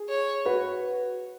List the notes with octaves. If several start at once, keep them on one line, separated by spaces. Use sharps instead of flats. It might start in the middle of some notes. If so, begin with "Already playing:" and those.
Already playing: G#4
C#5
F#4 B4